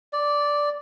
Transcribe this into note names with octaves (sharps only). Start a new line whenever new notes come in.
D5